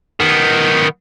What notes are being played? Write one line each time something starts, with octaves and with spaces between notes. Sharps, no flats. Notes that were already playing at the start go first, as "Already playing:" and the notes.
D#3 B3